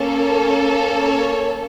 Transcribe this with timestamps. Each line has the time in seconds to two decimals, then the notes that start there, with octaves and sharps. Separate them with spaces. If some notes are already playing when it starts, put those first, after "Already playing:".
Already playing: A#3 C#4 A4
1.01 C#5